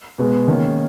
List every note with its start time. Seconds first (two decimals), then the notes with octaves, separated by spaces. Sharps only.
0.18 B2 G#3 B3
0.48 D#3 A#3 C#4